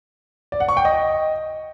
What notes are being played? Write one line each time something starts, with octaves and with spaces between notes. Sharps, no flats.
D5
F#5
C#6
G5
D#5